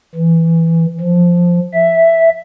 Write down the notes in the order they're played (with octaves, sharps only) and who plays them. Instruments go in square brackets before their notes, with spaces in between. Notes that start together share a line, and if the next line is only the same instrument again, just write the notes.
[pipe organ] E3
F3
E5